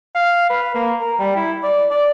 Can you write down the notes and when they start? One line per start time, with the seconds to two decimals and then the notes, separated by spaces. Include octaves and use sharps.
0.15 F5
0.50 B4
0.75 A#3
1.01 A#4
1.19 G3
1.36 E4
1.63 D5
1.90 D5